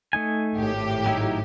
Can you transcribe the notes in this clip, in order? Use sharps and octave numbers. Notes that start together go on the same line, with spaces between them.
A3 D#4 G#5
G#1 A2 G4
F#3 D#4 E4